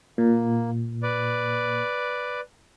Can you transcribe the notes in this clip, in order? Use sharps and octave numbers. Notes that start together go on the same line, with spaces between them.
A#2 A#3
B4 D5